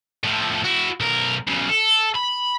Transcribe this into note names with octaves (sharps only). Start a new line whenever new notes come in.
A2 F3
E4 F#4
B1 A#4
B1 C#3
A4
B5